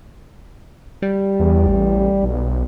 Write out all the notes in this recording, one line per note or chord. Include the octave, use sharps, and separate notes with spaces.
G3
E2
A1
B1